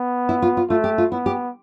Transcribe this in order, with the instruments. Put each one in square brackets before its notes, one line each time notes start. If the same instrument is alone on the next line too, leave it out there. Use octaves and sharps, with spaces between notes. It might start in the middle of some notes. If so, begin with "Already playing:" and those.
Already playing: [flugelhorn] B3
[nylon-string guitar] E4
F4
F4
[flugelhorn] A3 [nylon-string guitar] F4
[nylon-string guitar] G4
F4
[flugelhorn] B3 [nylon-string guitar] E4
[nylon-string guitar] G4